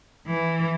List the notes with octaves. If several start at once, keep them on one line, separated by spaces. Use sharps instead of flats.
E3